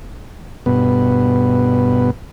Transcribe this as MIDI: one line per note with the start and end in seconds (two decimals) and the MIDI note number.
0.66 2.10 43
0.66 2.10 47
0.66 2.10 59